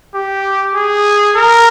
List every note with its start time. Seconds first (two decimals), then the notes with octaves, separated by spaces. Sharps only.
0.14 G4
0.75 G#4
1.36 A#4